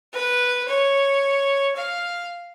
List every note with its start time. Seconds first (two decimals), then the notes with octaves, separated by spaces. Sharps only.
0.13 B4
0.68 C#5
1.76 F5